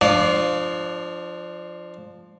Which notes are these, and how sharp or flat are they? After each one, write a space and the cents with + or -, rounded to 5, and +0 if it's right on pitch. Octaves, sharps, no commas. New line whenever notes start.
F3 +0 D4 +25 D5 -30